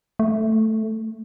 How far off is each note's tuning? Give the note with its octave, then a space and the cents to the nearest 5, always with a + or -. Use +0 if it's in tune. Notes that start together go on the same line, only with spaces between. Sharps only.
A3 +0